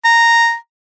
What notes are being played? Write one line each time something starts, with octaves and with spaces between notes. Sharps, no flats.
A#5